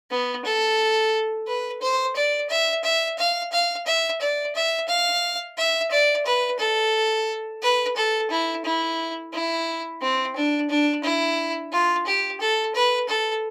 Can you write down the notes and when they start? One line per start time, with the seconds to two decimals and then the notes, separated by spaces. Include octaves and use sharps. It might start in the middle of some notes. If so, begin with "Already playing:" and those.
0.11 B3
0.45 A4
1.47 B4
1.81 C5
2.16 D5
2.49 E5
2.84 E5
3.18 F5
3.52 F5
3.86 E5
4.21 D5
4.55 E5
4.89 F5
5.57 E5
5.91 D5
6.26 B4
6.59 A4
7.62 B4
7.96 A4
8.30 E4
8.64 E4
9.33 E4
10.01 C4
10.35 D4
10.70 D4
11.04 E4
11.72 F4
12.06 G4
12.40 A4
12.74 B4
13.09 A4